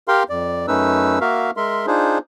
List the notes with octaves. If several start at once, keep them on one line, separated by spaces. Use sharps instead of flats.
G4 A#4 F5 G5 C6
F2 D5
F#2 A3 C#4 D#4 B4 E6
A#3 F#4 A#4 E5 F5
G#3 A#4 E5 C6
D4 D#4 F4 G#4 C5